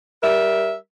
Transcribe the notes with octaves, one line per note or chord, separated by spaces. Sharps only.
G3 A#4 E5